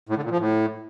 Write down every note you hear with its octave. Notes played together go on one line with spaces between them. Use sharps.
A2
D3
A#2
F3
A2